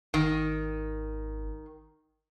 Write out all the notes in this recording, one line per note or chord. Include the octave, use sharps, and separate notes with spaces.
G#1 D#3